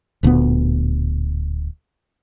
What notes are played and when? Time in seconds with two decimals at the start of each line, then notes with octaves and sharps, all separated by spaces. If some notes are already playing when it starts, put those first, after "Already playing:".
0.23 D1 D2 A#2 B3